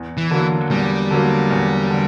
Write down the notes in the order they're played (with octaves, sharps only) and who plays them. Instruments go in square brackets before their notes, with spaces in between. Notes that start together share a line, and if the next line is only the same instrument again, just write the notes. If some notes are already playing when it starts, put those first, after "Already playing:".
Already playing: [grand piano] E2
[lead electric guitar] E3
[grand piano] D3 F#3 A#3
[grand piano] E2 [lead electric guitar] G3
[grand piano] D3 F#3 A#3
E2
D3